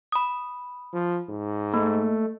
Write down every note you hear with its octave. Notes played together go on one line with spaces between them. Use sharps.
B5 D#6
F3
G#2
A3 A#3